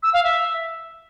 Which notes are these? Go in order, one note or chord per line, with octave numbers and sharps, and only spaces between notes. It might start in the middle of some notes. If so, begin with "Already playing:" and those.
E6
F5
E5